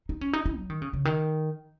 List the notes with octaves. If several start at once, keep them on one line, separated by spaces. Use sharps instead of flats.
D#4
C#4
D#4
E4
F#3
D#3
C#3
C#3
D#3